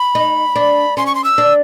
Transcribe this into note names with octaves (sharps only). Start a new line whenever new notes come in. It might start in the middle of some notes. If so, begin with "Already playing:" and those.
Already playing: B5
D#4
D4
C#4 C6
C#6
C6
E6
D4